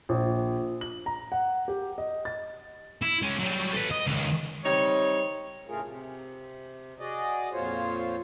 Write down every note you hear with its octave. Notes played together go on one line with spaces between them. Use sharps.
A#1
F#7
A#5
F#5
G4
D#5
A6
E4
G#3 C#4
F#3 G3
A4 B4
D#5
C#2 D#3
G3 C4 D#4 C#5
A2 C#3 A3 F4 G#4 A#4
C3
F#4 G#4 D5 D#5
F2 A#2 F4 C5 C#5